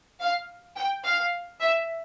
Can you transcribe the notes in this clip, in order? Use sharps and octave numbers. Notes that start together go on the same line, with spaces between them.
F5
G5
F5
E5